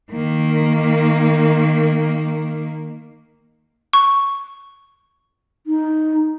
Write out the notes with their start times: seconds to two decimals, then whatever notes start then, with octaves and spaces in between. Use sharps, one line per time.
0.12 D#3 A#3
3.93 C#6
5.67 D#4